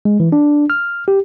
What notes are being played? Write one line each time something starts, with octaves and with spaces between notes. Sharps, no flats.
G#3
E3
D4
F6
G4